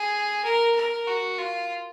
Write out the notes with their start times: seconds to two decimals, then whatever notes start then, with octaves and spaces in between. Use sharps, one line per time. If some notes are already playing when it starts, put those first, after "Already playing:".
Already playing: G#4
0.44 A#4
0.76 A#4
1.07 F#4
1.39 F4